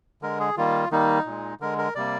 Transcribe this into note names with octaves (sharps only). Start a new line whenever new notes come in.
D3 G#3 A#4
G#4
D#3 G3 A#3 F4
D#3 G3 A#3 D#4
A#2 G#3
D3 G#3 A#4
A#4
C3 G3 A#3 D5